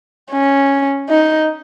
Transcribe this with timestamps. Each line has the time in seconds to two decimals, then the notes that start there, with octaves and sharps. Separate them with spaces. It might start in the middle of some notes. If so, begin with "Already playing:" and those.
0.32 C#4
1.09 D#4